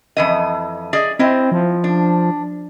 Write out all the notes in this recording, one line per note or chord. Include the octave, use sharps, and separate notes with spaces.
F2 E3 D#5
G#4 D5 D#5
C4 E4 D#5
F3
D4